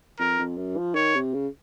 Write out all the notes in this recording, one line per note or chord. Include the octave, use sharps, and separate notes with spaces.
F2 A#4
F2
F#2
F3
D#3 C#5
C3
C#3